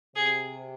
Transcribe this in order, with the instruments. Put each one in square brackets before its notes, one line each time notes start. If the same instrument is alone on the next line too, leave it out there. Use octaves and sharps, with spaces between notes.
[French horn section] C3 [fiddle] G#4